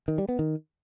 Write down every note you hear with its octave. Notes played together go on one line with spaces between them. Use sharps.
D#3
G3
B3
D#3